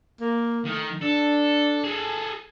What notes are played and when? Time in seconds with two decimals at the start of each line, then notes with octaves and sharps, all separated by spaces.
0.21 A#3
0.65 D#3 A3
1.02 D4 A4
1.84 G#4 A4